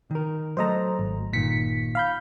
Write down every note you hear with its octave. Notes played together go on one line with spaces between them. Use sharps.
D#3 A#4
F#3 A3 C5 D#5 A#5
G#1
G1 A#2 D#3 B6 C#7
F5 B5 G6